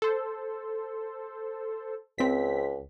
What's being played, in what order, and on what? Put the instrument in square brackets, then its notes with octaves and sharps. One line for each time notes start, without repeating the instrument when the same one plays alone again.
[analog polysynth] A4 C5
[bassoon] C#2 [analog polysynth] C4 B6